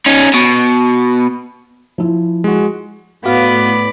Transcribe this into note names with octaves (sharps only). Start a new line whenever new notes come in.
C#4 D#4
B2
F3 E4
G#3 F#4
A2 B3 F#4 D5 F5 B5